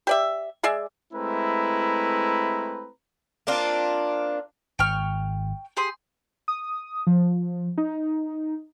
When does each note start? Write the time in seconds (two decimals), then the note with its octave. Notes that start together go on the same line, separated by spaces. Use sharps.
0.07 G4 D5 E5
0.63 G#3 G#4 D5 E5
1.12 G#3 A3 C4 E4 B4 A#5
3.47 A#3 C4 D4 F4
4.79 G#1 G5 C#6 F6
5.77 G4 G#4 C6
6.48 D#6
7.07 F3
7.78 D#4